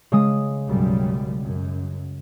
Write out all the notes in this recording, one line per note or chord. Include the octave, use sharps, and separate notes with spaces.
C#3 G#3 D#6
B1 F#2 G3
F#2